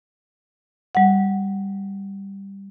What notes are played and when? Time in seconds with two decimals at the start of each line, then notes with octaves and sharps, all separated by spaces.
0.95 G3 F#5